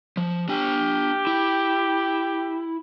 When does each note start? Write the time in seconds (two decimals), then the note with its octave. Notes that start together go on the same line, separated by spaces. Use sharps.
0.17 F3
0.49 D4 G4 G#5
1.27 E4